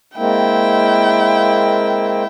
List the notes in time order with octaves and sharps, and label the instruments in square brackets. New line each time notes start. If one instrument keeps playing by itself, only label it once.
[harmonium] G#3 A#3 C4 [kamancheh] E4 G5